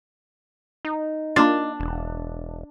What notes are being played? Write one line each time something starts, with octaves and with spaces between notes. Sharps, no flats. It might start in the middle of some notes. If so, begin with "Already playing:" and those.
D#4
A#3 D4 F4
E1